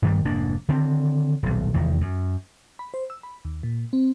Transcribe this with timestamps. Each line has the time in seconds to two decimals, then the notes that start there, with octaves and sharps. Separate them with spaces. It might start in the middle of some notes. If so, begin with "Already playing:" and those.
0.02 G2 D#3 G3
0.25 F1 G#2 A#3 D4
0.69 D3 D#3 C4
1.43 D#1 B1
1.74 F1 E2 D#3
2.01 F#2
2.79 B5
2.94 C5
3.10 E6
3.23 B5
3.45 D#2
3.63 A#2
3.93 C4